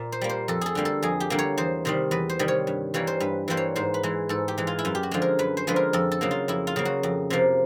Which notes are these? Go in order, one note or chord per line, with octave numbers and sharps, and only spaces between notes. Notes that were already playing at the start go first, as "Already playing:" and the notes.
Already playing: A#2
C5
G3 A#3
C5
F2 A4
G#4 A4
D3 G3 A#3
A4
F2 G#4
G4
D3 G3 A#3
C#5
E2 C5
C3 D#3 G3 C5
E2 B4
C5
C3 D#3 G3
C#5
G2
E3 G3 A#3 C#5
C5
G2 B4
E3 G3 A#3 C5
C#5
G#2 C5
B4
E3 G#3
G#2 A4
G4
E3 G#3
F4
E4
F#2 F4
G4
F#4
D3 F3 G#3
A#4
F#2 B4
C5
D3 F3 G#3 B4
A#4
F2 A4
A4
C#3 F#3 A#3
F4
F2 E4
F4
C#3 F#3 A#3
F#4
F2
C3 F3 A#3